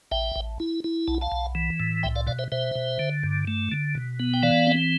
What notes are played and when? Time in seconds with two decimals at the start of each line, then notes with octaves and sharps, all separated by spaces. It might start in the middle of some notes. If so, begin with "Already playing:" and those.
0.11 A1 E5 G5
0.36 A1
0.60 E4
0.84 E4
1.08 B1 A5
1.21 F5 A5
1.32 B1
1.55 E3
1.80 A2
2.03 C2 E5 G5
2.16 D5 F5
2.27 B2 D5 F5
2.39 C5 E5
2.52 B2 C5 E5
2.75 B2
2.99 D3
3.23 G2
3.48 A3
3.72 D3
3.95 B2
4.20 B3
4.34 G5
4.43 E3 D5 F5
4.67 C4